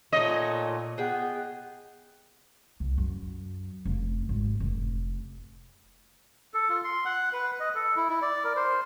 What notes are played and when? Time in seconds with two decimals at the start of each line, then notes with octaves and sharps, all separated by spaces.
0.13 A#2 A3 D#4 C#5 D#5
0.98 B3 G#4 G5
2.80 C2
2.98 F#2
3.85 F1
4.29 G#1
4.60 F1
6.54 A4
6.69 F4
6.84 C6
7.05 F#5
7.33 B4
7.60 D#5
7.75 A4
7.96 E4
8.09 E4
8.22 D5
8.44 A#4
8.56 C5